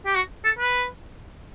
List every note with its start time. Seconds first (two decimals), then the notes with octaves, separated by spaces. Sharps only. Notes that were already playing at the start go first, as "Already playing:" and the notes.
0.06 G4
0.15 F#4
0.44 A4
0.59 B4